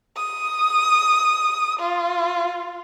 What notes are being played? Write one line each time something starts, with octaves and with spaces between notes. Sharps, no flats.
D#6
F4